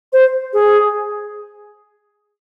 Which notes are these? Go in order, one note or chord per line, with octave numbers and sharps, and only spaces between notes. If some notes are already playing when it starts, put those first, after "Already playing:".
C5
G#4